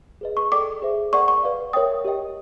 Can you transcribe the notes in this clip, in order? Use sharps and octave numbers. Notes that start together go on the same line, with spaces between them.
G#4 B4 D#5
C#6
A4 D5 G5 D6
G#4 C5 E5
A#4 D5 F#5 C#6
C#6
B4 D5 F5
A#4 C#5 E5 G5 D#6
G4 A#4 D#5 G5